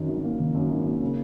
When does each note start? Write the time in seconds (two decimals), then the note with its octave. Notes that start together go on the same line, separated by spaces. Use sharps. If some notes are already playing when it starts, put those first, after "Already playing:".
Already playing: F#2 D#3
0.09 G#1
0.24 A#3
0.39 D#3
0.55 F#2
0.71 G#1
0.87 A#3
1.01 C#3